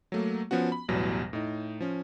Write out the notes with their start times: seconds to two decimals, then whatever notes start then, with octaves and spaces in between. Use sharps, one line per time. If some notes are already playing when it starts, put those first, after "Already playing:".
0.12 F#3 A3 A#3
0.51 F3 B3 C#4 F#4
0.72 B5
0.89 A1 E2 B2 F#3 G3 A#6
1.33 A2 D#4
1.80 F3 C#4